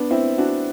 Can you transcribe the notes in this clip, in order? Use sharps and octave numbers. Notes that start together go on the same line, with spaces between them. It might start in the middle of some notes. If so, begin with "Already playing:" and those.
Already playing: B3 D4
C4 E4
D4 F#4